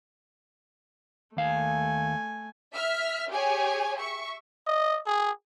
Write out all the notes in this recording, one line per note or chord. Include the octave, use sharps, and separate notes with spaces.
D#2 A3 F5 G#5
E5 F6 B6
G4 G#4 C#5 G#5
E5 C#6
D#5
G#4